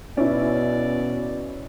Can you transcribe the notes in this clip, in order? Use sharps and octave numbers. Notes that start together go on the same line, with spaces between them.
B2 C#4 E4 D5